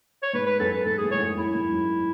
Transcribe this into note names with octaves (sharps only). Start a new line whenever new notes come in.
C#5
G#2 B4
B4
F#2 A4
B4
G#2 A4
A2 G#4
G#2 C#5
F#2
F#2 E4
G#2
F#2